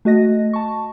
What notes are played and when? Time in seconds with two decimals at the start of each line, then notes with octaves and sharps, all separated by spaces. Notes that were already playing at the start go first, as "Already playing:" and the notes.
0.05 A3 F#4 D#5 A#6
0.53 A5 C#6